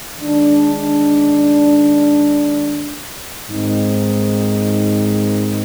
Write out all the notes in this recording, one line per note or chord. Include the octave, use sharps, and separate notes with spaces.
D#3 G#3 D4
G#2 D#3 G#3 C4 D#4